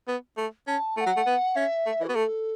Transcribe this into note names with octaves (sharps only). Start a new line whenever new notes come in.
B3
A3
C#4 A5
A3 A5
F#5
F#3
A3
B3
C#4 E5
A3
E3
F#4
B3
A3 A4